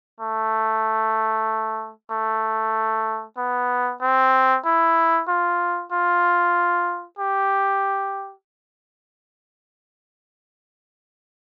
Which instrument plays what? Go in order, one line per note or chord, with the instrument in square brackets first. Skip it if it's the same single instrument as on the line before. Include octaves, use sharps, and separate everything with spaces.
[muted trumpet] A3
A3
B3
C4
E4
F4
F4
G4